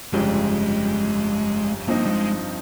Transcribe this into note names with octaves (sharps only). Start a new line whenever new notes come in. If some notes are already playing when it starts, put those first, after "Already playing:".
G1 F2 C#3 G3 G#3
G2 F3 A#3 C4 D#4
G3
G#3